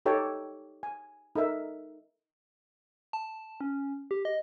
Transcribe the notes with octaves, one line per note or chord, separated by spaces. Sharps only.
D#4 G4 A4 C#5 G5
G#5
D#4 A4 A#4 E5
A5
C#4
G4
D#5